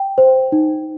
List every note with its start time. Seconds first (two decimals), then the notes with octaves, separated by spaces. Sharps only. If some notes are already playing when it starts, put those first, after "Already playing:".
Already playing: G5
0.18 C5
0.52 D#4